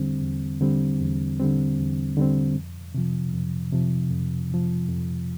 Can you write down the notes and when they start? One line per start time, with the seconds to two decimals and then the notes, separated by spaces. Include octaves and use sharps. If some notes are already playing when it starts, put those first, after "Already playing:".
Already playing: E2 D3 G3 C4
0.22 E2
0.61 D3 G3 C4
1.00 E2
1.40 D3 G3 C4
1.78 E2
2.17 D3 G3 C4
2.56 F2
2.94 C3 F3
3.33 F2
3.72 C3 F3
4.11 F2
4.50 C3 F3
4.89 F2